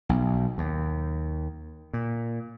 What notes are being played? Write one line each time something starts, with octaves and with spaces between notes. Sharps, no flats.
B1
D#2
A#2